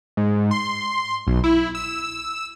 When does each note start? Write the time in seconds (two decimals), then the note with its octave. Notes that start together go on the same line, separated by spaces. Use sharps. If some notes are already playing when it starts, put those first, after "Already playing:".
0.17 G#2
0.51 C6
1.27 B1
1.44 E4
1.75 E6